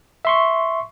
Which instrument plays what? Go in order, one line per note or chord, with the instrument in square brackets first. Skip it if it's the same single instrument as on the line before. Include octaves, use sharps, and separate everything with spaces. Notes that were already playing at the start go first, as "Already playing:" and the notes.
[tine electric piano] E5 C6 C#6